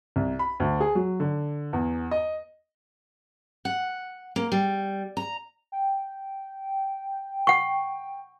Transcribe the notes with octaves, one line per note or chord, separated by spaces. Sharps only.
C2
B5
D2
G#4
F#3
D3
E2
D#5
F#5
A#3
G3
A#5
G5
F#5 C#6